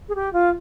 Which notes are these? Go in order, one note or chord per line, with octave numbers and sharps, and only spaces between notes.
G#4
G4
F4